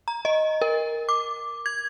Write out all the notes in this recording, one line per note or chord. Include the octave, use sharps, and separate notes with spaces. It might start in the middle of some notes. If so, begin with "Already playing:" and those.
A#5
D#5
A#4
D6
G#6